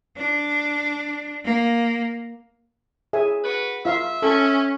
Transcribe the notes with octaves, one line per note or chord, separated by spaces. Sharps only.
D4
A#3
G#4 E5 G#5
F#4 B4
F4 E5 F5
C#4 A4